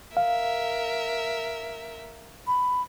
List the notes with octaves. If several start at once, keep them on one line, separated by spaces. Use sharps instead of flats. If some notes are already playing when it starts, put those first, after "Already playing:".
A#4 E5 F5
B5